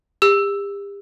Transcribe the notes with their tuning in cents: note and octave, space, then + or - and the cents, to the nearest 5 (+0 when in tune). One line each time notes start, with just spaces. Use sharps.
G4 +40 E6 +0